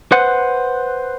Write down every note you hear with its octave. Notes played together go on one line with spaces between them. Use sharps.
B4 C5 F#5